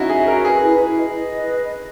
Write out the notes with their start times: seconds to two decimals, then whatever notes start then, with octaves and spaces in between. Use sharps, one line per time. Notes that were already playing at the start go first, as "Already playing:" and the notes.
Already playing: C#4 D#4 E4 F#4
0.09 G#4 E5
0.27 F#4 A#4
0.45 G#4 B4
0.63 E4
0.80 E4
0.98 D#5
1.14 D#5
1.32 B4